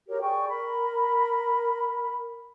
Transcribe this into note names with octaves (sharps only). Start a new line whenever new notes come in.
F#4 G4 A#4 C#5
G#4 D5 G5 C#6
A#4 B5